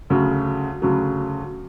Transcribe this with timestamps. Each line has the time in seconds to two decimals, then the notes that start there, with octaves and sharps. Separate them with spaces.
0.10 D2 C#3 F#3
0.82 D2 C#3 F#3